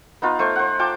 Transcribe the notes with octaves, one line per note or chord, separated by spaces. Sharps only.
B3 D#4 F4 B4
A3 C5 C#6
C5 F#5
F4 G5 A5 D6